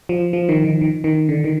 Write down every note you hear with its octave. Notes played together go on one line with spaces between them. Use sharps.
F3
F3
D#3
D#3
D#3
D#3
D3
D#3